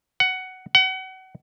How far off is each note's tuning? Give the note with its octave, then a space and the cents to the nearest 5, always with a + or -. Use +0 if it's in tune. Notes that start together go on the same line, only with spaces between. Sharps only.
F#5 +10
F#5 +30